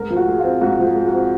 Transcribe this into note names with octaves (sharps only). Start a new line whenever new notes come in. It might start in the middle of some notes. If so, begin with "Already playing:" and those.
Already playing: G#2 A#4
F3
F#4
G#3
C4 F4
G#2 F#4
F3
G#4
G#3
F#4
C4